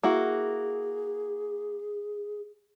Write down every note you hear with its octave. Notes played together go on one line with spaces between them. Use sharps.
A#3 E4 F#4 G#4